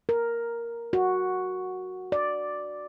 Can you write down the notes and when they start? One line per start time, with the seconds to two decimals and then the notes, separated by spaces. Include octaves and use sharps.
0.09 A#4
0.93 F#4
2.12 D5